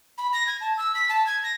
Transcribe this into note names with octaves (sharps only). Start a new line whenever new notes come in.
B5
A#6
G#6
A5
E6
B6
A5
G#6
A#6